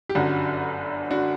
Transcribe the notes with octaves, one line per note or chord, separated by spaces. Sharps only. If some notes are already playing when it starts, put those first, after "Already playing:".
G4
G1 F#2 D3 D4 F#4
D4 F#4